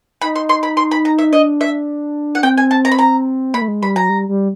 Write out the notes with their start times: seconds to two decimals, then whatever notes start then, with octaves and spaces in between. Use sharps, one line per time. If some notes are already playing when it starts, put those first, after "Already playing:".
0.21 D#4 B5
0.36 C6
0.49 C6
0.63 B5
0.77 C6
0.91 B5
1.05 A#5
1.18 E5
1.32 D4 D#5
1.61 E5
2.35 F#5
2.43 C4 G5
2.58 G#5
2.71 A5
2.85 A#5
2.92 B5
2.99 A#5
3.54 A#3 B5
3.62 A3
3.68 G#3
3.82 G3 B5
3.96 F#3 A#5
4.09 G3
4.29 G3